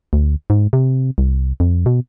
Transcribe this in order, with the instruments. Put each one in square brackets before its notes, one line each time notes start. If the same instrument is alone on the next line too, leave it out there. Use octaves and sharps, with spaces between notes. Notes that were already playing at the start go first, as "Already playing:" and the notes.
[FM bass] D2
G#2
C3
C2
F2
B2